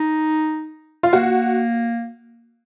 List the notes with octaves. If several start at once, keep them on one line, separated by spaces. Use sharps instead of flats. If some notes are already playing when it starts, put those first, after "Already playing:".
Already playing: D#4
F4
A#3 F#4